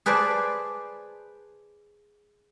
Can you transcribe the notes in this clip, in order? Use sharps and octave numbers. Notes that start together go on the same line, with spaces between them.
G#4 B4 C5 D5 A5